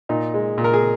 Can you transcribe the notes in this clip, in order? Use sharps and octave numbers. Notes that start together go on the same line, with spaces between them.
A#2 D#4
G#3
A#2
A#4
G#4